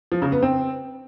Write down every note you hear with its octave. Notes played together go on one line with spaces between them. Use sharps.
F3
C#3
B3
C4